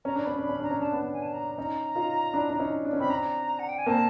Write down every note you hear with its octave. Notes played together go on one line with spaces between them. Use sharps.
C#4 A#5
D4
C#4 B5
D4 B5
C#4
D4 A#5
C#4
D4 A5
B3 C#4
G#5
A5
A#5
C#4 D#4 A#5
D#4 F4
D4 E4
D4
C#4 D#4
D4
C#4
C4 D4 B5
A#5
F#5
G5
G#5
A#3 C4 A5